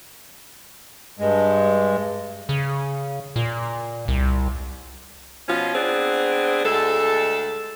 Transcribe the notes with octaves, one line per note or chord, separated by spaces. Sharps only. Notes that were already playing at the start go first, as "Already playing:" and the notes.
G2 G#3
C#3
A#2
C2
B2 F3 C#4 F4
B3 C4 D4 G#4
D2 G#3 A4